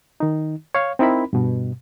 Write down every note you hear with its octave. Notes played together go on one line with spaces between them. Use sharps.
D#3 D#4
C#5 F5
C4 D#4 E4 A#4 B5
G2 B2